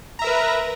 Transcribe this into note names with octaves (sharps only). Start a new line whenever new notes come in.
A#4 B4 E5 A#5